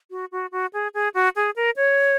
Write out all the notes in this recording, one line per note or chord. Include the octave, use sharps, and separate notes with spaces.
F#4
F#4
F#4
G#4
G#4
F#4
G#4
A#4
C#5